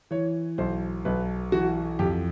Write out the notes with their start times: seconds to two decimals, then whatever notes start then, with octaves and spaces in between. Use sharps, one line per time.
0.11 E3 C#5
0.58 B1 C5
1.05 B1 B4
1.52 E3 F#4
1.99 F2 G4